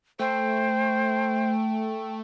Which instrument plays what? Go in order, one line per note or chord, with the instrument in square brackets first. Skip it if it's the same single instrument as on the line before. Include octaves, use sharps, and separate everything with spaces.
[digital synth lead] A3 [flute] C5 [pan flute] G5